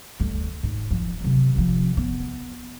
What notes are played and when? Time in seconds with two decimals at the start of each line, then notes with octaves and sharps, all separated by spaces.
0.20 D2 G3
0.63 G#2
0.91 F3
1.21 C3 F#3
1.55 C3 F3
1.97 B3